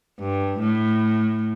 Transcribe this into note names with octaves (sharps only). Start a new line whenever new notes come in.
G2
A2